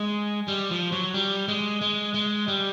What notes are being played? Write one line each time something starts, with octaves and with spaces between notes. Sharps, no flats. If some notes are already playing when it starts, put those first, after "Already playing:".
Already playing: G#3
G3
F3
F#3
G3
G#3
G#3
G#3
G3